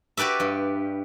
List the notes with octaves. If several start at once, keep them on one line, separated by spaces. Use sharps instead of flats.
F#4 G4 B4 D5 E5
G2